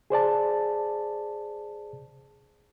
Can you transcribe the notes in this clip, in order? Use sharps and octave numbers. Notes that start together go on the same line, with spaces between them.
G#4 C5 D5 A5